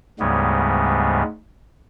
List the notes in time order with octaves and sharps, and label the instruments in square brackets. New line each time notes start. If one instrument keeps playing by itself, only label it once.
[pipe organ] D2 G#2 C#3 G3 G#3 B3